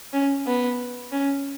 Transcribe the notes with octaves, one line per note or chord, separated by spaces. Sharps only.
C#4
B3
C#4